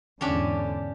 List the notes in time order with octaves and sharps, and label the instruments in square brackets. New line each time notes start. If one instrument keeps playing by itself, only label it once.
[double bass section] E2 G#2 D3 [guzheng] C#4 D4 G4